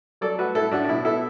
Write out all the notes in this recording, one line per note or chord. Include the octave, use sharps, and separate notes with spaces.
F#3 A4 D5
A3 F#4 B4
A2 E4 A4
A2 D4 F#4
D4
B2 E4
B3 E4 A4